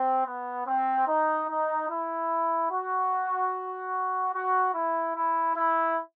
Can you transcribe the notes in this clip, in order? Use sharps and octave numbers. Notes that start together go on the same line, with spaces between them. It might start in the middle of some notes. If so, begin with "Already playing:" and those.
Already playing: C4
B3
C4
D#4
D#4
E4
F#4
F#4
E4
E4
E4